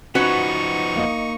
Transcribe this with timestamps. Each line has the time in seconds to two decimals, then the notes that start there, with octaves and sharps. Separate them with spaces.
0.15 F3 B3 C#4 D#4 F#4 B4 C#6
0.96 A#3 D#5